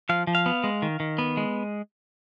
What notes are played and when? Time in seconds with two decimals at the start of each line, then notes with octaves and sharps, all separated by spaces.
0.09 F3 F5
0.27 F3
0.35 F5
0.46 B3
0.64 G#3
0.82 D#3
1.00 D#3
1.18 B3
1.37 G#3